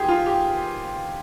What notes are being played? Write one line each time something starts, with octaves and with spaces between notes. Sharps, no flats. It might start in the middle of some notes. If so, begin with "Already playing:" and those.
Already playing: D#2 F3 G4 G#4 C5
F4
G4